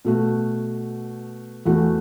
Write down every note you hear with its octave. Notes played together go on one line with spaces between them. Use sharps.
B2 A3 F#4
E2 E3 A3 F#4